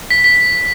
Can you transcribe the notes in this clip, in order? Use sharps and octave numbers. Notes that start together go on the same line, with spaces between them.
B6
B6